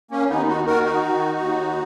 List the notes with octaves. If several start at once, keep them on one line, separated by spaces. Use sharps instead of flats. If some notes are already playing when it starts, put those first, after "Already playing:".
A#3 C#4
D#2 B3 D#4
D#4 F#4
D#3 F#4 A#4
D#4 F#4
D#3
D#2